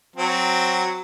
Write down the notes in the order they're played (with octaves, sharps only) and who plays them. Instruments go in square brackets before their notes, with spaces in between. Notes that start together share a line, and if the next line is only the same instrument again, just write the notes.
[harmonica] F#3 C4